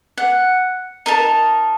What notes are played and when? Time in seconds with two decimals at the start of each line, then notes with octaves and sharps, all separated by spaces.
0.17 F#5
1.06 D#4 A#4 A5